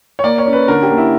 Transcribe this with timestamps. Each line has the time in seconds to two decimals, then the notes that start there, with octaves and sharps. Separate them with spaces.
0.19 C#5
0.24 A#3 D5
0.38 C#5
0.46 C#4
0.53 B4
0.68 D3 A#4
0.83 G4
0.91 A#3
0.98 E4